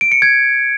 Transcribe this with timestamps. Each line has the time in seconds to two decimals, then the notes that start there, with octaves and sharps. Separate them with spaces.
0.01 D7
0.12 C#7
0.22 G#6